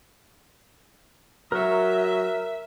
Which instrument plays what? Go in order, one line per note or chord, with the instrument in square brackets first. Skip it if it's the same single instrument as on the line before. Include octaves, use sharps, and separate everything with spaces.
[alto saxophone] F#3 [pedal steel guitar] A#4 C#6 [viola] E5